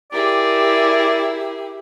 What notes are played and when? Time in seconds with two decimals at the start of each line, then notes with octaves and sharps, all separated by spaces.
0.12 E4 G4 G#4 A#4 D5